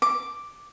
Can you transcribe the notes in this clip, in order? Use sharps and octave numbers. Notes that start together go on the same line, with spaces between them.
D6